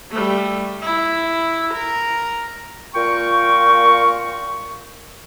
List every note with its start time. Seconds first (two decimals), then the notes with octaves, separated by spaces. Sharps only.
0.11 G3 A3
0.82 E4
1.74 A#4
2.95 A#2 F4 A#4 G5 C#6